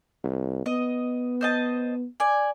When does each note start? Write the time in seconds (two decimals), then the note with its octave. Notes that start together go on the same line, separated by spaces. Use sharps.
0.24 C2
0.66 B3 D#5
1.41 C5 D#5 A5
2.20 D5 G#5